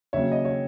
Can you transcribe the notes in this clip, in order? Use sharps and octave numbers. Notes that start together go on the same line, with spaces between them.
D#2 C#3 F#3 C#4 C#5 E5
D#5
C#5